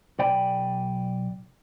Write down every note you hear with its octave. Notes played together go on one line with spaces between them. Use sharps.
B1 D5 G5 G#5 B5